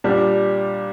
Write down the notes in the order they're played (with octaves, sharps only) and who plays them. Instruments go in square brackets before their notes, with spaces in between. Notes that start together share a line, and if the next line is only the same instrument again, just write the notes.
[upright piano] A#2 G3 D4 G4